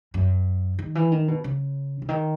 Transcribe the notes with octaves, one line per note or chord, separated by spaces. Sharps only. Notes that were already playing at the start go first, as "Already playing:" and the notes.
F#2
D#3
E3
D#3
B2
C#3
C#3
D#3